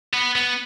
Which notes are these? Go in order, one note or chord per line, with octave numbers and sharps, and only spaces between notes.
B3
B3